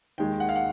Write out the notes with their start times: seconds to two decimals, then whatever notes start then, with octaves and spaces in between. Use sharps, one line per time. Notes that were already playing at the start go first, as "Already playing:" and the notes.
0.18 D#2 D#3 G#3 G5
0.40 F#5
0.49 F5
0.56 F#5